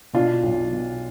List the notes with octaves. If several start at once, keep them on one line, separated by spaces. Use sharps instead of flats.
B2 D4 F4
B1
B2